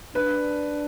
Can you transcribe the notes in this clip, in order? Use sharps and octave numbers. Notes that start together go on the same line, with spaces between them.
D4 B4